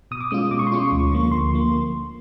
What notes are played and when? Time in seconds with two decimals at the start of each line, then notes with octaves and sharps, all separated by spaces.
0.11 B2 D#6
0.20 D6
0.31 G#3 C#4 F4 D#6
0.51 B2 D6
0.59 C#6
0.67 C6
0.72 G#3 C#4 F4 C#6
0.92 D2
1.12 D3 F3 A#3
1.31 D2 C6
1.52 D3 F3 A#3